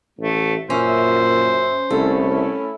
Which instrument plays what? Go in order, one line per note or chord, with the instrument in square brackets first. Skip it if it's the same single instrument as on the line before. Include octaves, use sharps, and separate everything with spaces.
[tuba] A1 [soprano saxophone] A3
[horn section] F#2 E5 [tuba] A#2 [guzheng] C#4 [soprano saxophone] C5
[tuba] C2 [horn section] A3 C#4 E4 [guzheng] A4